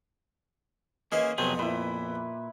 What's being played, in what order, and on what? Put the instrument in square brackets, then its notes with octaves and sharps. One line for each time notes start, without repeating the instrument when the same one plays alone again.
[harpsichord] E3 G#4 C5 [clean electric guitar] A#3 C#4 [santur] D#5
[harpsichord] F2 B3 [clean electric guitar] C3 F#3 G#4 [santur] C5
[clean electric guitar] A#2 [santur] E4 B4